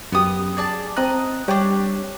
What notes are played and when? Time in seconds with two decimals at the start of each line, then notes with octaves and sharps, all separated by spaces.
0.12 F#2 B3 G4 D#6
0.57 G#4 D5 A5
0.97 C4 D#5 A#5 F#6
1.48 G3 D4 G4 C#5 G5